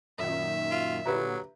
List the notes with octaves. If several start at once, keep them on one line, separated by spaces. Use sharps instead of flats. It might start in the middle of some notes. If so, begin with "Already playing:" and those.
F#2 A#2 D#3 E5
F4
A#2 D3 F#3 G4 B4 A#5